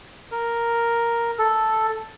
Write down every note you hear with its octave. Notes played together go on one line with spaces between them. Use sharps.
A#4
A4